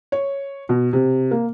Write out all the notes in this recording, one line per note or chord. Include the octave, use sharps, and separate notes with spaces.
C#5
B2
C3
A#3